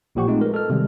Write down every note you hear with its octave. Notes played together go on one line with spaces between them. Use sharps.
A1 A#2 F3 G4 F#5 C#6
G#3 A3 C4 D#4 F4
A#4 B4
A4 D#5 F6
C3 D#3 G3 G#3